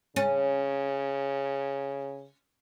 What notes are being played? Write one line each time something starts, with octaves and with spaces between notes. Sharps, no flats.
C#3 C#4